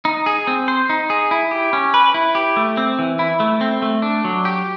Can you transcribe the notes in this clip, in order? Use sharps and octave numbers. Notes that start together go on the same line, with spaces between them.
D#4
G#4
C4
C5
D#4
G#4
E4
G4
C#4
B4
E4
G4
A3
C4
E3
E4
A3
C4
A3
D4
F#3
G4